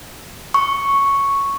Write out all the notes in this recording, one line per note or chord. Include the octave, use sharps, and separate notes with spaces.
C#6